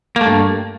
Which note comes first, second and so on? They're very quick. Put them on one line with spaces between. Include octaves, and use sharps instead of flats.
A#3 A3 G2